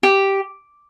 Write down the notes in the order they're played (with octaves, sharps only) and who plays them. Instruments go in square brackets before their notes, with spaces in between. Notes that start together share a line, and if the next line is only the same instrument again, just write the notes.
[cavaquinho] G4